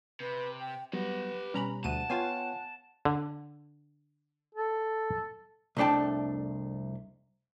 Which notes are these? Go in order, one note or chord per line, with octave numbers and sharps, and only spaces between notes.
C3 B4
G5
F#3 G3 B3 G4 B4 F#5
B2 G3 C#4 A#5 B5
D2 F#5 A5 D#7
B3 F4 C#5 F5 G5 G#5
D3
A4
C2 F2 A3 D4 G5 A5